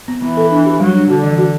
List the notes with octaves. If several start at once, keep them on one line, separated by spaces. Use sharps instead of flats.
B3
E3 B3
A4
D4
G4
F#3 G3
D4
D3 F#4
E3
F#4